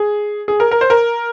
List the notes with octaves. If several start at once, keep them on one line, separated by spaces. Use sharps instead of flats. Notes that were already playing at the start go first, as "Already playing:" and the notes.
Already playing: G#4
G#4
A#4
A#4
C5
A#4